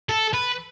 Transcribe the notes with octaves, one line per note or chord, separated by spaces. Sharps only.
A4
B4